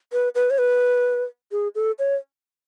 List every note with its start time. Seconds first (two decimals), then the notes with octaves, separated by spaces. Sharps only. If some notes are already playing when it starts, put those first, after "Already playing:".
0.12 B4
0.35 B4
0.50 C#5
0.58 B4
1.52 G#4
1.75 A4
1.99 C#5